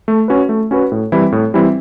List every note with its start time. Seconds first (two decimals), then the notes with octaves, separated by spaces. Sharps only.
0.08 A3
0.28 C#4 F#4 B4
0.49 A3
0.71 C#4 F#4 B4
0.92 A2
1.12 E3 G3 C4 E4
1.32 A2
1.54 E3 G3 C4 E4